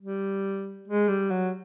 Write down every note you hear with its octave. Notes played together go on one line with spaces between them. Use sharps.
G3
G#3
G3
F#3